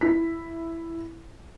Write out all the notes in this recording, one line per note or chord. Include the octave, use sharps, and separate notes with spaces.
E4 B6